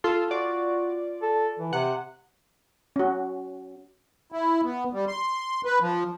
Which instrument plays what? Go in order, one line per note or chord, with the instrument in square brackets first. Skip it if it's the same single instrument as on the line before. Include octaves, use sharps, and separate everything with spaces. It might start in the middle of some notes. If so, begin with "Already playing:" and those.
[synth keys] F4 A4 C6
[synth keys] F4 D5 [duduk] F#4
[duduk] A4
E3
[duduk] C3 [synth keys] F#5
[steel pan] C#4 F#4
[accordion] E4
B3
G3
C6
B4
F3